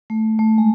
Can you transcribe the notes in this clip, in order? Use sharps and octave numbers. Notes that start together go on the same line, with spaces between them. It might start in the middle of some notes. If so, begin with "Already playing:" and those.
A3
A3
G#3